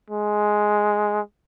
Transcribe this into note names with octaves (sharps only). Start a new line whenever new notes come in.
G#3